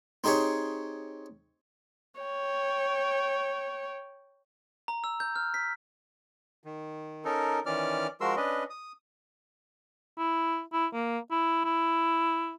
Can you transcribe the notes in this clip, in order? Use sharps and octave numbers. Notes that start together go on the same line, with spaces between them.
C4 D#4 G4 G#4 C#5
C#5 G5
A#5
E6
G6
F6
B6
D#3
C#4 D#4 A4 A#4
D#3 E3 C#4 D5 D6 F6
F3 G#3 F#4 A#4 C6 E6
C#4 D4 B4 D#5
D#6
E4
E4
A#3
E4
E4